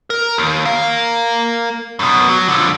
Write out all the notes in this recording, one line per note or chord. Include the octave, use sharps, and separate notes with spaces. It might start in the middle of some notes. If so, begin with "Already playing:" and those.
A#4
D#2
A#4 F5
F#2 B2
F#3
F2 D3